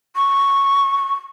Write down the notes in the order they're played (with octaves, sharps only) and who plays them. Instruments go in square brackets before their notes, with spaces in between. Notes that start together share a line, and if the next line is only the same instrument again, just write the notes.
[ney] C#6